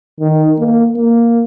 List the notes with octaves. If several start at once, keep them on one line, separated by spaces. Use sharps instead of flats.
D#3
A#3
A#3